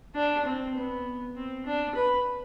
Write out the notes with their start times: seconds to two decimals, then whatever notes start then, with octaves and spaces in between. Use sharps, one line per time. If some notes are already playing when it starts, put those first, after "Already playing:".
0.15 D4
0.45 C4
0.75 B3
1.36 C4
1.66 D4
1.95 B4